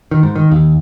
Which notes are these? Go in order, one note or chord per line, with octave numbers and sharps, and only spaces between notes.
D#3
G#2
D#3
D#2